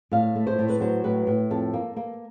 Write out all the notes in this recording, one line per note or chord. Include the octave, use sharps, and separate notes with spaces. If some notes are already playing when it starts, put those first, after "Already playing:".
A2 F5
A3
C5
A2
B4
F#3 C5
A2 B4
A2
F2 A4
A#3
A#3